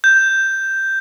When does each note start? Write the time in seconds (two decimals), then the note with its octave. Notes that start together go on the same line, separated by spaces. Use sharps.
0.04 G6